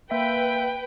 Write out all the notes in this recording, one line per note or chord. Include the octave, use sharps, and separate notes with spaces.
A#3 B4 E5 G5 B6